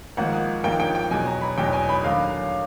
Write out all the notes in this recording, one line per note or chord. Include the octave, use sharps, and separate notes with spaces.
G#1 G#2 F3 A#3 F#5
G#1 G#2 F3 A#3 G5
G5
G5
E2 B2 F#3 G#5
A#5
B5
E2 B2 F#3 G5
G#5
B5
D#2 D3 F#3 F5